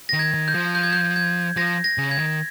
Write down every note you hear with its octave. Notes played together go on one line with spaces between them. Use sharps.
D#3 A#6
G#6
D#3
G6
F3
G6
G#6
G6
G#6
F3 A#6
A#6
C#3
G#6
D#3